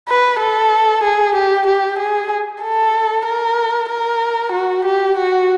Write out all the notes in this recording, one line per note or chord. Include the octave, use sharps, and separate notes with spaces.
B4
A4
G#4
G4
G4
G#4
A4
A#4
A#4
F#4
G4
F#4